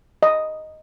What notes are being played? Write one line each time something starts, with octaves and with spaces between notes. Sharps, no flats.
D#5